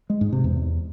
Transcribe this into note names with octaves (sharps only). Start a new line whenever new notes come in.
G#3
G#2
C3
E2